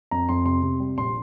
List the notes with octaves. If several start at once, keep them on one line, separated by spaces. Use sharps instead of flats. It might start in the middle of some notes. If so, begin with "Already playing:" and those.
F2 A#5
F2 C6
C3 C6
C3
G3
A#1 C6